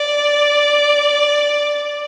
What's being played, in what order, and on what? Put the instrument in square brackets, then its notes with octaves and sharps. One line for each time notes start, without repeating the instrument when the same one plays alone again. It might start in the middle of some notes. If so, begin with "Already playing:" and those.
Already playing: [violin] D5